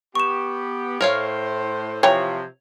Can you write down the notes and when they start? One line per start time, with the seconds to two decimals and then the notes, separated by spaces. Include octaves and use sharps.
0.15 B3 G4 C#6 E7
1.01 A2 A#4 C5 C#5 F5
2.03 C3 E3 F3 C4 C#5 G5 A#5 F7